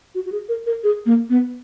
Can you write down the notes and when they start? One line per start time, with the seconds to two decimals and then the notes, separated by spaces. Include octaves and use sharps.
0.15 F#4
0.26 F#4
0.32 G#4
0.49 A#4
0.66 A#4
0.84 G#4
1.06 A#3
1.30 B3